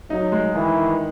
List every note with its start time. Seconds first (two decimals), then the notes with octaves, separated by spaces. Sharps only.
0.10 F#3 D#4
0.32 G#3
0.54 D#3 E3
0.76 D#3